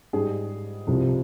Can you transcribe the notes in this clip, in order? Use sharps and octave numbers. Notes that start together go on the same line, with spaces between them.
G#2 G3 G#4
C2 C3 F3